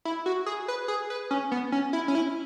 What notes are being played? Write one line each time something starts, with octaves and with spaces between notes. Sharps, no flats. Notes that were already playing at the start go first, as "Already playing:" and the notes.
E4
F#4
G#4
B4
G#4
B4
C#4
B3
C#4
E4
C#4
E4